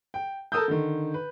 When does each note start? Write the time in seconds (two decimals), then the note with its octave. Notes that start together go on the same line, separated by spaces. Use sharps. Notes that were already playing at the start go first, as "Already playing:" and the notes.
0.14 G5
0.52 A4 A#4 D#6 E6 G6
0.68 D3 D#3
1.14 B4